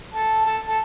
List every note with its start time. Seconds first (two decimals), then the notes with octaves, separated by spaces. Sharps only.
0.13 A4
0.46 A4
0.67 A4